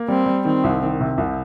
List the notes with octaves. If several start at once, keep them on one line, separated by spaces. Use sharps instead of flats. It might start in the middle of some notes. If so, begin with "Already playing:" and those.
Already playing: A#3
G3 C4
G3
D#3 C4
C2
D#3
C3
C2